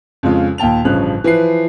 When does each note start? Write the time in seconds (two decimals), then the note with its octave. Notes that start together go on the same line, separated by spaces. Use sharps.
0.23 F2 C#3 G#3 F4
0.58 D#2 A#2 G5 A5 F7
0.85 A1 G2 C#3 F3 F#6
1.24 E3 F3 B4 C7